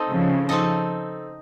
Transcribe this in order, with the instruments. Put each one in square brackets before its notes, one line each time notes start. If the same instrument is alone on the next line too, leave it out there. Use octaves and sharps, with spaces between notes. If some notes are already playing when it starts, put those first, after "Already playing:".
Already playing: [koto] C4 D#4 A4 D#5
[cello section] C#3 F3
[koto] C4 D#4 A4 D#5